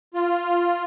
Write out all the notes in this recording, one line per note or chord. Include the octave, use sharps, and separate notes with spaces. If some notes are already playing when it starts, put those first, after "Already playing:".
F4